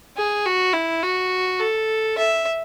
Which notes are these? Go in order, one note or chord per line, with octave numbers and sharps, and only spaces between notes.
G#4
F#4
E4
F#4
A4
E5